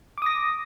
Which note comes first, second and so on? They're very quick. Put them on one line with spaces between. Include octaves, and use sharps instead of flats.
D6 D#6 A#6